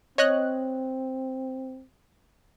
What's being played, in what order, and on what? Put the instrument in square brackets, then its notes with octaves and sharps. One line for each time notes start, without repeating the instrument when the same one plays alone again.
[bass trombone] C4 [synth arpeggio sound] C#5 D#5 F#6